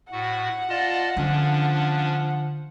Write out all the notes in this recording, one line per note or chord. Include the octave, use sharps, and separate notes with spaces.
A2 F#4 F#5
F4 D5 D#5 A5
D3 F3 C#4 D4